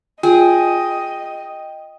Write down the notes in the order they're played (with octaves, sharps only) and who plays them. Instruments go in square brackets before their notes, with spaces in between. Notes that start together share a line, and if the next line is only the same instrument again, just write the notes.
[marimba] F4 [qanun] G#4 [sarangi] D#5 [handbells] G5